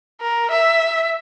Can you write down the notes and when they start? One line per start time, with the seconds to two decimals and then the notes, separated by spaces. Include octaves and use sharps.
0.21 A#4
0.51 E5